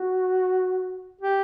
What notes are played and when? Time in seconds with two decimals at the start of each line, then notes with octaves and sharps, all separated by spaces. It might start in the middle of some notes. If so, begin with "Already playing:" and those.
Already playing: F#4
1.21 G4